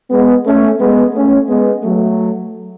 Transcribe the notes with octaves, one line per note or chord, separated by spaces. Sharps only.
G#3 B3
A3 C#4
G#3 B3
A3 C#4
G#3 B3
F#3 A3